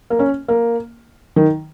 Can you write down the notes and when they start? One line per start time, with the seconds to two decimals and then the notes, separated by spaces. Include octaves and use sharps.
0.10 A#3
0.19 C#4
0.48 A#3
1.36 D#3